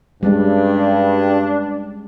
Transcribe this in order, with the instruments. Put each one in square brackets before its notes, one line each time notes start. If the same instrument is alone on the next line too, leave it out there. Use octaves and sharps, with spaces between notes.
[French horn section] G2 [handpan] G3 G#3 C#4 [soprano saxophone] D4